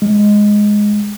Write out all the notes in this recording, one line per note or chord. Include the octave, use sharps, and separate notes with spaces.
G#3